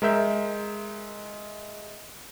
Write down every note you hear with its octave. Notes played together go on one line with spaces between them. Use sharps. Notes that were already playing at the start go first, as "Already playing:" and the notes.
G#3 A#4 E5 G6